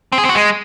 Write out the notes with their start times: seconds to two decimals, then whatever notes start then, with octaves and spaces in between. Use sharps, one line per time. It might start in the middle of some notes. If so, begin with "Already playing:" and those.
0.12 C4
0.18 G#4
0.24 C4
0.29 F#4
0.35 G#3